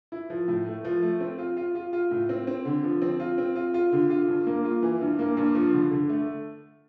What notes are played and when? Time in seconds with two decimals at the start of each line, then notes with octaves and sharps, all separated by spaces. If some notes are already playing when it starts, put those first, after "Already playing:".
0.12 E4
0.30 F3
0.48 A2
0.66 A3
0.85 F3
1.02 A3
1.20 C4
1.38 F4
1.57 F4
1.75 F4
1.93 F4
2.11 A2
2.29 C4
2.47 C4
2.65 D3
2.84 F3
3.02 C4
3.20 F4
3.38 C4
3.56 F4
3.74 F4
3.92 D3
4.10 F4
4.28 G2
4.46 A#3
4.65 F4
4.83 E3
5.01 G2
5.19 A#3
5.37 G2
5.55 F3
5.73 D3
5.91 D3
6.09 A3